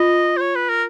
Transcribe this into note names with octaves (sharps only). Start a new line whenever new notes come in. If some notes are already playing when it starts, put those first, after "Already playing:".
Already playing: F4 D#5
C5
C#5
B4
A#4